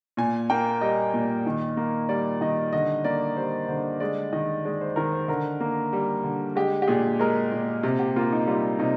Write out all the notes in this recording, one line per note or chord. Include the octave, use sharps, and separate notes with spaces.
A#2 G#5
A#3 G5
G3 D#5
A#2
D#3
A#3
G3 D5
D#3 D#5
D3 D#5
A#3 D5
G3 C5
D3 C5
G#3 D5
D#3 D#5
G#3 D5
C5
D#3 A#4
C5
D3 A#4
A#3
G3
D3
G#3 G4
G4
A#2 G#4
G#3 A#4
A#2
C3
G4
A#3 F4
D#4
G3 F4
C3 D#4